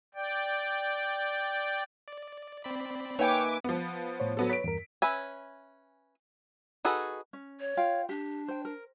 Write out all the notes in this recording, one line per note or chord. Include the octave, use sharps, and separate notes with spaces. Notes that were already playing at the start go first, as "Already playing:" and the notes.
D5 G5
D5
C4 D5 B5
A#3 D#4 B4 C#5 E5 G5 G#5 D6
F3 B3
A2 C5 C#5
F#3 B3 A4
B4 C#5 B6 D7
E2 G2 A#4
C#4 B4 E5 G#5
D#4 F#4 G#4 A4 B4
C#4
C#5
F4 F5 G5
D4 G4
C5 G5
A#4